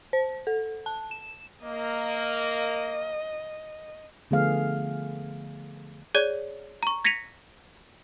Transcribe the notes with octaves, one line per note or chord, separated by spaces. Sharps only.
C5
A4
A5
E7
A#3 D#5
D3 F3 A3 B3 G#4 F5
G#4 C#5 D5 G#6
A#5 C#6
G#6 A#6 B6 C#7 D#7 F7